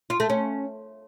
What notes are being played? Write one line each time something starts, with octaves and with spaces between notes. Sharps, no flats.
F4
A3
C#4